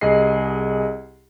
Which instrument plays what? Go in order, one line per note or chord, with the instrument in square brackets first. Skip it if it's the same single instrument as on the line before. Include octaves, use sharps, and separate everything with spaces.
[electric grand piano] C2 G#4 D#5 C7